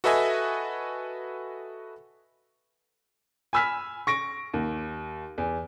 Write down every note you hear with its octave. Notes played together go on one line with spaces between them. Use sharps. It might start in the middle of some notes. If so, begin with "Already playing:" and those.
F#4 A4 B4 D#5 E5 G#5
G#5 B5 E6 F6 B6
C#6 A#6 D7
D#2
E2